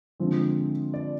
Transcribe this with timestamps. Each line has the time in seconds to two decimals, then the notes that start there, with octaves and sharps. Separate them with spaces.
0.20 D3 F3 G#3 C4
0.94 D5